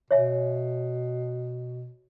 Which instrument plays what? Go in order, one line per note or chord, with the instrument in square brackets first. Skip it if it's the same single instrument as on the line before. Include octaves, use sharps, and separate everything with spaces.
[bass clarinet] B2 [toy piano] C#5 E5 G#5